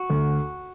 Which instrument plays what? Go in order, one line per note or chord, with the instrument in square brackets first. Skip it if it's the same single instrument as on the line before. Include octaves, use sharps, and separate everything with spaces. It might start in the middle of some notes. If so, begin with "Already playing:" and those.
Already playing: [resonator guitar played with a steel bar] F#4
[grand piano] D2